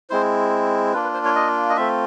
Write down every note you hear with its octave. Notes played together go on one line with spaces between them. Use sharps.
G#3 C4 E4 C5
A#3 D4 F4 B4
B4
C5
C#5
D#5
D#5
A3 C4 F4 E5